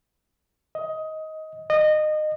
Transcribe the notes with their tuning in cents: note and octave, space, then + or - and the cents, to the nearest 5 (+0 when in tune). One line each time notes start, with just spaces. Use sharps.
D#5 +15
D#5 -25